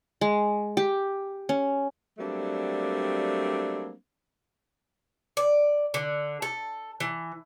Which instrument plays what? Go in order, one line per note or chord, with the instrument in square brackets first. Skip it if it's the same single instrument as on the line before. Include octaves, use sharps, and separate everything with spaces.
[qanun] G#3
G4
C#4
[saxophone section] F#3 G3 A3 A#3 C4 D4
[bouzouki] D5
D3
A4
E3